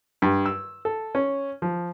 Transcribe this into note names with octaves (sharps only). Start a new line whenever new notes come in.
G2
E6
A4
C#4
F3